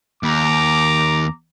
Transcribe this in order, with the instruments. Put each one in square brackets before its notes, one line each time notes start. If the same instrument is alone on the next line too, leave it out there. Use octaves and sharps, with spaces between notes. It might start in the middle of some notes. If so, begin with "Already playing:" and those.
[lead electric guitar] D#2 [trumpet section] A#5 D6